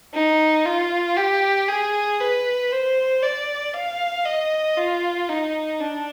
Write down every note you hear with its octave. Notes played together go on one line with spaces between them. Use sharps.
D#4
F4
G4
G#4
B4
C5
D5
F5
D#5
F4
D#4
D4